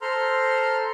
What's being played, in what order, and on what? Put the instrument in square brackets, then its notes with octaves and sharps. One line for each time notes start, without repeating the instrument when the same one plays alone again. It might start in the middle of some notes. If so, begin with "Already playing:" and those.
[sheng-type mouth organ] A4 C5 A#5 C6 F6